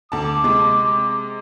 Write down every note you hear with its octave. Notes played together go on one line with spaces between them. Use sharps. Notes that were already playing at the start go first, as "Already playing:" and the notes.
D2 A5 D6
C3 G#3